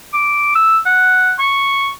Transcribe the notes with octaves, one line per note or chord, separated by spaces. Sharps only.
D6
E6
F#5
C#6